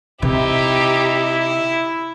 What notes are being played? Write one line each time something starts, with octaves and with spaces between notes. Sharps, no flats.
C3 D#4 E4 G4